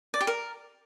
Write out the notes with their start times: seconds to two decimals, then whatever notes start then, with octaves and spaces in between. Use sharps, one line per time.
0.14 D5
0.21 G4
0.27 A#4